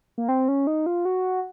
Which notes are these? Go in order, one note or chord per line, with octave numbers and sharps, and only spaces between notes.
A#3
C4
C#4
D#4
F4
F#4